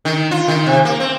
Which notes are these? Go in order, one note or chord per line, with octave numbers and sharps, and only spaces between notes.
D#3
F4
D#3
C3
A#3
C4